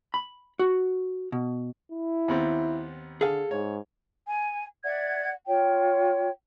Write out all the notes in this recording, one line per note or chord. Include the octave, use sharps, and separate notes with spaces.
B5
F#4
B2
E4
D#2 B3 C4
D3 G#4 A4 F5
G#2 C#5
G#5
D5 E5 F#5 G#6
F4 C#5 G5